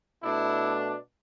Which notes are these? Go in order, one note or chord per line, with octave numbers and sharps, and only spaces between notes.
B2 A3 D4 E4